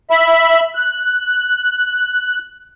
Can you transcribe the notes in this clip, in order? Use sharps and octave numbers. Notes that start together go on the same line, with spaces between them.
E5 B5
F#6